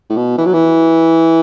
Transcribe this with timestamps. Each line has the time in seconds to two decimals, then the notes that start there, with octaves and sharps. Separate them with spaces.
0.10 A2
0.16 B2
0.38 E3
0.46 F#3
0.53 E3